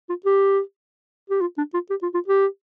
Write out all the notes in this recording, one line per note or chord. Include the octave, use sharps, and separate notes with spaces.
F4
G4
G4
F4
D4
F4
G4
F4
F4
G4